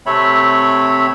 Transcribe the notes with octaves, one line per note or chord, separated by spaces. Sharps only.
C3 A3 C4 C#5 E5 B5